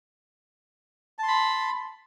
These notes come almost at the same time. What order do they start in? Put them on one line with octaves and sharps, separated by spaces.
A5 C6 B5